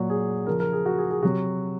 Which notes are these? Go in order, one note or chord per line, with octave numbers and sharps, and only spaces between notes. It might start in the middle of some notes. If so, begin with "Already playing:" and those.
Already playing: A#2 F#3 F#4
G#4
C#3 F3 A#4
A#4
G#4
F#4
G#4
G#4
C3 F#3 F#4